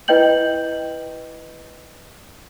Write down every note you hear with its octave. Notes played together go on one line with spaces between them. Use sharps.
E4 B4 D#5 G5 G6 F#7